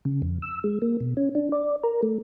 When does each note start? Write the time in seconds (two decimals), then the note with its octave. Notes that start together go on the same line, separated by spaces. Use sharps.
0.05 C#3
0.22 F2
0.42 E6
0.64 G#3
0.82 A#3
1.00 B2
1.17 C#4
1.35 D4
1.52 D5
1.84 A#4
2.03 A3